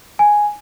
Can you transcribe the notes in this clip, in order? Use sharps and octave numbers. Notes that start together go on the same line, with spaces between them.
G#5